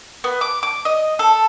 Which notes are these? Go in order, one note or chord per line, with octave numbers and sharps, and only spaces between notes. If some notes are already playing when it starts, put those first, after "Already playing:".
B3
D6
D6
D#5
A4